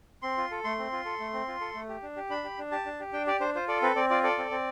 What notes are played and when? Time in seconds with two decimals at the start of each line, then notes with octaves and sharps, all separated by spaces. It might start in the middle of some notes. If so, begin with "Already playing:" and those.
0.22 C4 C6
0.37 F4
0.51 A4
0.64 A3 C6
0.79 C4
0.92 F4
1.05 A4
1.20 A3
1.34 C4
1.48 F4
1.61 A4
1.74 A3
1.89 G4
2.02 D4
2.17 G4
2.30 D4 B5
2.44 G4
2.58 D4
2.72 G4 A5
2.86 D4
3.00 G4
3.13 D4 G5
3.27 G4 D5
3.40 D4 C5
3.55 F4 C5
3.68 A4 D5
3.82 C4 B4
3.96 C4 D5
4.10 F4 D5
4.23 A4 D5
4.38 C4
4.51 C4